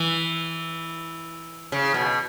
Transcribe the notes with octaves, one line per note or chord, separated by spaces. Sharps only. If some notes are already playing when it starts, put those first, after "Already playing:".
Already playing: E3
C#3
B2